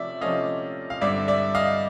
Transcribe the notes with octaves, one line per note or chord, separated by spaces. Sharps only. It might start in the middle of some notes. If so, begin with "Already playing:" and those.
Already playing: C3 F3 A3 C#4 D5 E5
C3 F3 A3 C#4 D#5 F5
F5
G2 D3 G3 C4 D5 E5
D5 E5
D#5 F5